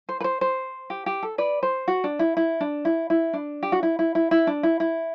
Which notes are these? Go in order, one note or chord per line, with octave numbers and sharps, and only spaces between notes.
C5
B4
C5
C5
G4
G4
A4
B4 D5
C5
F#4
D4
E4
E4
D4
E4
E4
D4
G4
F#4
E4
E4
E4
E4
D4
E4
E4